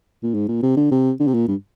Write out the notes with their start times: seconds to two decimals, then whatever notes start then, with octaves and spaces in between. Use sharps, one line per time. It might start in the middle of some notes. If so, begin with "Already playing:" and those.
0.23 A#2
0.34 G#2
0.48 A#2
0.62 C3
0.77 D3
0.91 C3
1.20 D3
1.27 C3
1.34 A#2
1.48 G2